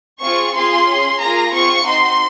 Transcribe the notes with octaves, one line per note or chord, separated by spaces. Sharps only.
C4 F4 G#4 C#6
C4 F4 G#4 C6
C#4
G#4
A#3 F4 G#4 A#5
C4 F4 G#4 C#6
C4 D#4 F#4 C6